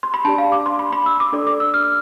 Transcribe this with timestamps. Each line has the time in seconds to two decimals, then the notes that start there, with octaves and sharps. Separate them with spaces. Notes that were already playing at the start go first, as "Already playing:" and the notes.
0.03 C6
0.14 B5
0.25 D4 G4 D5 A5
0.38 F5
0.52 D6
0.66 C6
0.79 B5
0.92 B5
1.06 E6
1.20 D6
1.33 D4 A4 D5
1.47 D6
1.60 E6
1.74 F6